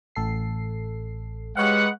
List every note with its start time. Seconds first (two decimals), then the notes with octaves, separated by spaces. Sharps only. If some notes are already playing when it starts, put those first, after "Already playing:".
0.16 A1 A4 C7
1.57 G#3 G4 B4 C#5 F5 F#5